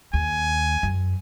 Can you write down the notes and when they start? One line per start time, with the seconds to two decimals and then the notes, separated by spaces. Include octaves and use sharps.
0.13 D#2 G#5
0.83 F#2